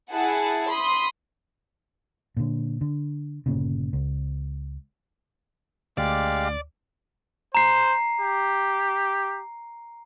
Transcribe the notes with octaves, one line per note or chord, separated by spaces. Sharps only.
E4 G#4 F#5 A5
B5 C6 D#6
A#2 D3
D3
G1 A#2 C#3
C#2
D2 G#3 G4 D5 F5
C5 A#5 C7
G4